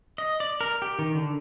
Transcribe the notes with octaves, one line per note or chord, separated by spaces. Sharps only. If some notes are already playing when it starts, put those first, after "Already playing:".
D#5
D5
A#4
G4
D#3
D3